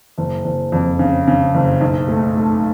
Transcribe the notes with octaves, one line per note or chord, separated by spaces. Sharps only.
F#1
F#1
F2
C#3
C#3
F#1
B1
A3
A3